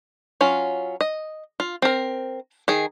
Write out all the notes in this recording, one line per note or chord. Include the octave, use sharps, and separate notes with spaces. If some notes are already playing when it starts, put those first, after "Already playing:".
F#3 C#4 F4
D#5
F4
C4 A#4
D#3 G#4